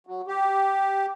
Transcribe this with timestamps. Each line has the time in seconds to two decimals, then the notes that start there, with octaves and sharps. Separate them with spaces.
0.07 F#3
0.28 G4